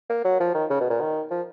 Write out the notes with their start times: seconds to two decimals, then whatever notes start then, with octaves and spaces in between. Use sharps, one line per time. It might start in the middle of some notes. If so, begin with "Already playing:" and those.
0.10 A#3
0.25 F#3
0.40 F3
0.54 D#3
0.70 C#3
0.81 B2
0.90 A#2
1.00 D#3
1.31 F3